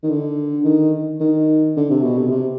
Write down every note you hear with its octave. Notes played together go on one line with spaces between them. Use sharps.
D#3
D3
D#3
D#3
D3
C3
B2
C3
C3